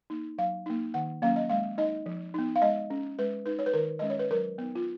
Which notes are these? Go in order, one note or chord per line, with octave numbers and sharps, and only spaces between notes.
A#3 D#4
F#3 F5
A#3 D#4
D#3 F#5
F#3 A#3 C#4 F5
D#5
G#3 F5
D#4 D#5
F3
B3 D#4
F5
G#3 D#5
C#4
G#3 B4
D#4 B4
C#5
B4
D#3 A#4
G#3 C#4 D#5
C#5
B4
F#3 A#4
B3 D#4
F4